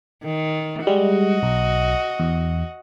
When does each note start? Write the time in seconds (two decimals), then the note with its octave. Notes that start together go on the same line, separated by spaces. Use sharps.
0.25 D#3
0.87 G3 G#3 F#4 D#5
1.43 B1
2.19 E2